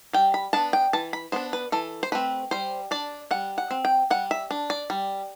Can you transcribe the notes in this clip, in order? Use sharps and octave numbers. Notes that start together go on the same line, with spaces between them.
G3 G5
B5
B3 D4 A5
G5
E3 A5
B5
B3 D4 C5
B4
E3 A4
C5
A3 C4 B4
G3 C5
D4 D5
G3 F#5
F#5
C4
G5
G3 F#5
E5
D4
D5
G3